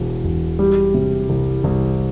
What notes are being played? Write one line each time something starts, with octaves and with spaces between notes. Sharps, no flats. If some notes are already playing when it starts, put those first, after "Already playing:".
Already playing: E1 E2 B2
E1
G3
C3
C2
C2